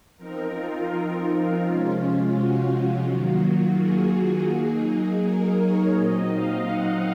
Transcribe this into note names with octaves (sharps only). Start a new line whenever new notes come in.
F3 C4 D#4 A#4
F4
C3 F3 G#3 C#4
F#4
D#3 F#3 A#3 F4
G#4
F#3 A#3 D#4
A#4
C#5
A#2 F#3 C4 D#4 D#5
F5
F#5